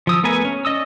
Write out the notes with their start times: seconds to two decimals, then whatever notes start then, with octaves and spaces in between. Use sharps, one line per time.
0.07 F3 D#6 E6
0.23 A3 B3 A#4 B4 G#5
0.45 C#4
0.65 C#4 D5 D#5 D#6 E6